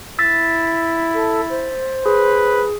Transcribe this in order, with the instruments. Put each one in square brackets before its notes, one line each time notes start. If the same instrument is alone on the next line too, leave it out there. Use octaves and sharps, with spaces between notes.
[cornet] E4 [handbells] E6 A6 B6
[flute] A4
C5
[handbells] G#4 [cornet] B4